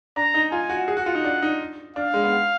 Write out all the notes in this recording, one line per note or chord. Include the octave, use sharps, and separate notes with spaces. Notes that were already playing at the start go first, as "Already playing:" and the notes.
D4 A#5
D#4
F4 G#5
F#4
G#4 F#5
F#4
F4
D#4
D4
D#4
D4 F5
G#3
B3